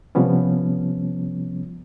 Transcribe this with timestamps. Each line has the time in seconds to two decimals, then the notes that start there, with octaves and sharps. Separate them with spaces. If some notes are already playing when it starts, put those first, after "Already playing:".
0.15 C3 F3 G3 B3 C#4